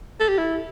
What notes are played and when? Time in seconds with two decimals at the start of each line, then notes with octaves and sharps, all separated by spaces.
0.20 A4
0.29 G4
0.38 E4